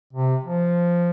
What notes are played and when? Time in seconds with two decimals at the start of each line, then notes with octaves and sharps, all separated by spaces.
0.13 C3
0.44 F3